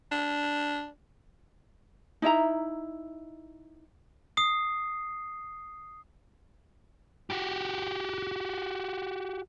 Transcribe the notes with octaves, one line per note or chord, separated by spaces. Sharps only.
D4
D#4 E4 E5 A#5
D#6 C7
F#4 G4